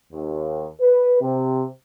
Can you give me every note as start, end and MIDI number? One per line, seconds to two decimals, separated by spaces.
0.12 0.66 39
0.81 1.17 71
1.21 1.66 48